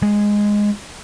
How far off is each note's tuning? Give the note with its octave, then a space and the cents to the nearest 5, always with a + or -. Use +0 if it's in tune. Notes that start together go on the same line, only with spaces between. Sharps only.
G#3 -5